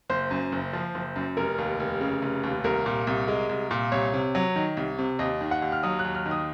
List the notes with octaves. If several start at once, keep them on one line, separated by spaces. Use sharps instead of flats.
F#1 C5
F#2
F#1
F3
F#1
F#2
F1 A#4
D#2
F1
C#3
F1
D#2
C2 A#4
A#2
C2
G#3
C2
A#2
C2 C#5
C3
F#3
D#3
C2
C3
D#2 D#5
D#3
F#5
D#2
F6
F#3 D#6
F#6
D#2
F6
D#3
D#6